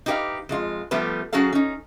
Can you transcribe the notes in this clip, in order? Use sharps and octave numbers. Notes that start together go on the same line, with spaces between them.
D#4 E4 G4 A#4 B4 F5
F2 G#3 F4
F3 G3 A3 B3 B4
F#3 C#4 F#4 G#4 A4 F5
C#4 D#4